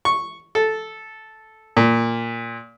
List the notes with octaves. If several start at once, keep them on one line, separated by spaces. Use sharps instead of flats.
C#6
A4
A#2